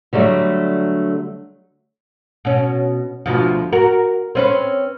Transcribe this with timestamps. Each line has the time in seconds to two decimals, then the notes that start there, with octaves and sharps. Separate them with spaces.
0.13 D3 F#3 G3 A3
2.45 B2 C#4
3.26 D2 B2 F3
3.73 F#4 A#4
4.35 C4 C#4 B4